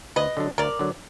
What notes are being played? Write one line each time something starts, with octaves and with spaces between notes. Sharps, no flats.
D2 B4 D#5
D3 F#3 D4
D2 A#4 D5
D3 F#3 D4